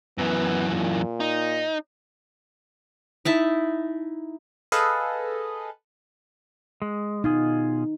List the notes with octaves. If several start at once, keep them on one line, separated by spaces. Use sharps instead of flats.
F#2 E3 B3
A#2
D#4
D#4 E4 A5
G#4 A4 B4 D#5 F5
G#3
B2 D#4 F4 G#4